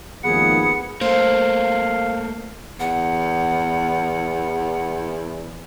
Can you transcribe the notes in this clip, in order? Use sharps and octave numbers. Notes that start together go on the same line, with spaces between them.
G#1 D#2 F3 B3 G#4 B4 F#5 C#7
A3 A#3 C5 F5
E2 F#5